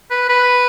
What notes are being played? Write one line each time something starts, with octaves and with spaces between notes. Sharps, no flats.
B4
B4